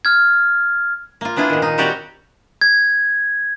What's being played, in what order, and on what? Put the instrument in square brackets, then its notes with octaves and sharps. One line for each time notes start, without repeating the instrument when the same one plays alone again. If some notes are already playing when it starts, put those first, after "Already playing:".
[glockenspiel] F6 G#6
[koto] A#3 F4
B3 D4 E4 F4 G#4
A#2 D#3
D#4
G3 C4 F#4 G4 C#5 D5
[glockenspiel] G#6